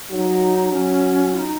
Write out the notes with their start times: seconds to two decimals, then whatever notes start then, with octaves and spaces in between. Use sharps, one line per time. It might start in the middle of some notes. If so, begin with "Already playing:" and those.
0.11 F#3 D#4
0.72 F#3 C#4
1.34 F4
1.39 D#4